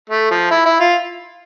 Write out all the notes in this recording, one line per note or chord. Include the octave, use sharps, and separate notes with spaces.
A3
F3
E4
E4
F4